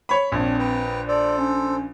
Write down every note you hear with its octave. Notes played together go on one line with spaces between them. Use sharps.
C#5 B5
A#1 C4 D4 C#5
B4 G5 A#5
A4 C5 D5
C#4